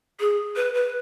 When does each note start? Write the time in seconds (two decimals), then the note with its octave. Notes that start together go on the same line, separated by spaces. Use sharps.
0.20 G#4
0.56 B4
0.74 B4